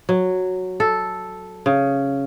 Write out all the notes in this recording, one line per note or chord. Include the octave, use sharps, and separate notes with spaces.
F#3
A4
C#3